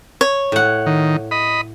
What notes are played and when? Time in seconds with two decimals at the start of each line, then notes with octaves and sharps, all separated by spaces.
0.21 C#5
0.52 A2 F#5
0.86 D#3
1.31 D#5 B5